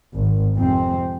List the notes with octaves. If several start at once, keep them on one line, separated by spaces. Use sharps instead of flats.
G#1
F2 C3 G#3 C4